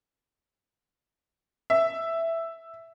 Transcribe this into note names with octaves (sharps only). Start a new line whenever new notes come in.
E5